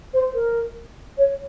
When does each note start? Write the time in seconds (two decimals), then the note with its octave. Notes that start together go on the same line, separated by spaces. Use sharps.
0.13 C5
0.34 A#4
1.17 C#5